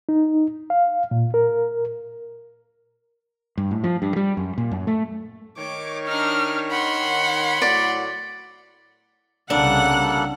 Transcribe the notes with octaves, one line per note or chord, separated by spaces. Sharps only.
D#4
F5
A#2
A#4
G2
A2
F3
G2
G3
F#2
A#2
F#2
A3
D#3 C#5 D6
D4 D#4 F6
F#5 B5 C6
A2 F#3 D5
C2 C#3 G3 A#3 D4 A4 F#5 F#6